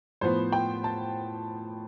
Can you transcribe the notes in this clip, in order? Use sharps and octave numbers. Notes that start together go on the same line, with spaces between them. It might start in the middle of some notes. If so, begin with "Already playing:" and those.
A2 F3 B3 C5
G5
A5